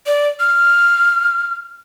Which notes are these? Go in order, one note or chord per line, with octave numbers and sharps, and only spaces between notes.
D5
F6